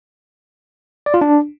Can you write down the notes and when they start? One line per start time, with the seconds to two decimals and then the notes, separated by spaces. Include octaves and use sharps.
1.06 D5
1.14 F4
1.21 D4